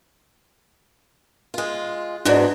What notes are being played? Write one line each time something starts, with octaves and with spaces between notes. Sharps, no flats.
G#3 F4
E2 G#2 B2 D4 D5